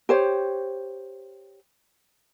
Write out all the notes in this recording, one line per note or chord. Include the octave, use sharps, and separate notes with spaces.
G4 C5 C#5